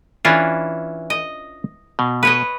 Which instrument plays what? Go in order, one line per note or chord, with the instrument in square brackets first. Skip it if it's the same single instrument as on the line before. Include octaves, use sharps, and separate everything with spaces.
[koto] E3 [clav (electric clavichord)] C#4 D4 F4
[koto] D#5
[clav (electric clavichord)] B2
[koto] B4 C#5 D#5